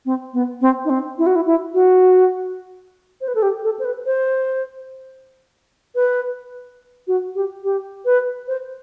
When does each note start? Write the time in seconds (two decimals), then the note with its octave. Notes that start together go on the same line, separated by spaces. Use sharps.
0.05 C4
0.33 B3
0.61 C4
0.85 D#4
0.90 C4
1.18 E4
1.26 F#4
1.35 E4
1.46 E4
1.74 F#4
3.21 C5
3.28 B4
3.35 A4
3.42 G4
3.64 A4
3.79 C5
3.85 B4
4.06 C5
5.95 B4
7.07 F#4
7.35 G4
7.64 G4
8.05 B4
8.48 C5